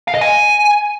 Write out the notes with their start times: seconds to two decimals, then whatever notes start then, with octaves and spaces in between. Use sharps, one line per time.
0.08 F5
0.15 D#5
0.21 G#5